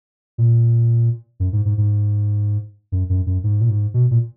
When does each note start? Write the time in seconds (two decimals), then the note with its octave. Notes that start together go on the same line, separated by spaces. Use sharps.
0.38 A#2
1.40 F#2
1.53 G#2
1.65 G#2
1.78 G#2
2.92 F#2
3.09 F#2
3.26 F#2
3.44 G#2
3.61 A#2
3.69 G#2
3.94 B2
4.11 A#2